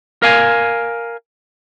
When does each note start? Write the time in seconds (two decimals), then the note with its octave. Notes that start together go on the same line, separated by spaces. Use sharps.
0.22 A#4 F5 G#5